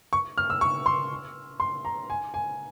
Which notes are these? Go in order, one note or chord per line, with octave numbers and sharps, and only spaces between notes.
C#6
F6
E6
C#6
C6
C6
A#5
G#5
G#5